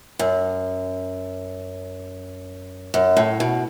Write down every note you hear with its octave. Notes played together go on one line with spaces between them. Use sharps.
F#2
F#2
A2
B2